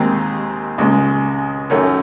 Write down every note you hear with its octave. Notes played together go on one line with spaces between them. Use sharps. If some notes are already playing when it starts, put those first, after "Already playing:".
Already playing: D#2 D#3 G#3 C4
C#2 C#3 G#3
F#2 D#3 A3 C#4